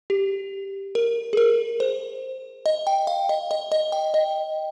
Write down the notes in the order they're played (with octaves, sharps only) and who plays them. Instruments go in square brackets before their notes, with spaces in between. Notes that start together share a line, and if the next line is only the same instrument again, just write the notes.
[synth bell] G4
A#4
G#4
A#4
C5
D#5
G5
F5
D#5
D#5
D#5
G5
D#5